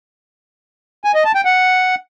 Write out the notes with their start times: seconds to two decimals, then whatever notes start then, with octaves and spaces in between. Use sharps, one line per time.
1.04 G#5
1.15 D#5
1.25 A5
1.35 G5
1.45 F#5